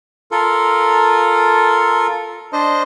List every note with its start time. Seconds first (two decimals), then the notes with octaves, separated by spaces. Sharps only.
0.31 F4 A4 A#4
2.53 D4 C5 D#5